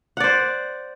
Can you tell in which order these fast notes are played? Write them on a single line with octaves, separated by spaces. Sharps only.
F#5 D5 C5